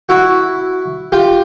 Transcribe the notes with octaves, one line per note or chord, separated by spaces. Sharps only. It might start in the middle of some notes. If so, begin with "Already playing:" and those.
E4 F#4
F4 G4